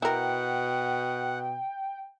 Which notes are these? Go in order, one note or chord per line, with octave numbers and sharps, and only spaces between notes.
B2 E4 A#4 F#5 G5